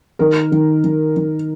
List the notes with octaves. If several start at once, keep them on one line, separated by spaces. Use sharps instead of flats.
D#3 A#4
D#3
D#3
D#3